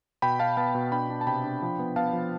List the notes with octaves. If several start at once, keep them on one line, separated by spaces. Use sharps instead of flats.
B2 G5 B5
B2 F5 A5
B3 F5 A5
B2
D4 G5 B5
D4
A5
C3 G5 B5
D4
F3
B3
B3 F5 A5
F3